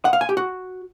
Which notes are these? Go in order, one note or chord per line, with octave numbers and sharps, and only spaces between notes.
F#5
F5
G#5
G4
F#4